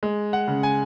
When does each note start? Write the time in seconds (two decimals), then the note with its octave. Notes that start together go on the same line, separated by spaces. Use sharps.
0.03 G#3
0.33 F#5
0.48 C#3
0.63 G#5